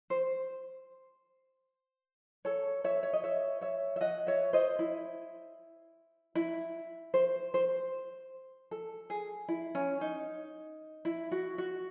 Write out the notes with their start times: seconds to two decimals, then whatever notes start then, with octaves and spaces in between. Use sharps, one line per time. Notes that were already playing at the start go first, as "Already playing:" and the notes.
0.10 C5
2.45 A4 C#5
2.84 C#5 E5
3.03 C#5
3.13 D#5
3.24 C#5 E5
3.61 C#5 E5
3.96 E5
4.01 D#5 F#5
4.27 C#5 E5
4.53 C5 D#5
4.79 E4
6.35 E4
7.14 C5
7.54 C5
8.71 A4
9.10 G#4
9.48 E4
9.75 C#4
10.01 D#4
11.05 E4
11.32 F#4
11.58 F#4